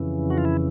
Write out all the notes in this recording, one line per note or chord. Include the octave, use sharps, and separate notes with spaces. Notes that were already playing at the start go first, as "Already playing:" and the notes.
Already playing: F2 C#3 E3
F#4
F4
E4